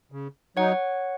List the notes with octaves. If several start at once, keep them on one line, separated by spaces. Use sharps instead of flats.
C#3
F#3 D#4 C#5 F#5